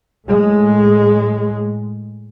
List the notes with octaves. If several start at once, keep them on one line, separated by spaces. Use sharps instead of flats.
A2 G#3